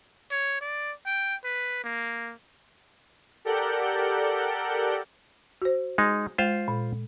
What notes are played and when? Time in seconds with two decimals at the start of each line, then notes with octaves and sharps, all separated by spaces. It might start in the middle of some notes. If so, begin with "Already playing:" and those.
0.31 C#5
0.61 D5
1.06 G5
1.44 B4
1.84 A#3
3.45 G4 A4 A#4 D5 F#5 G6
5.62 F#4 C5
5.98 G#3 D#4
6.38 G#3 F4 C5 F5
6.68 A#2